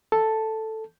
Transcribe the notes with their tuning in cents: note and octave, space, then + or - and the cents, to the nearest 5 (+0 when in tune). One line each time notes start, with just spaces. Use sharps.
A4 +0 A5 +0